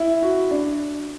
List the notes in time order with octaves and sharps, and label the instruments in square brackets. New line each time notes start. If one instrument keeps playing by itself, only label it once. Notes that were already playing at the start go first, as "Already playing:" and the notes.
Already playing: [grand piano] E4
F#4
D4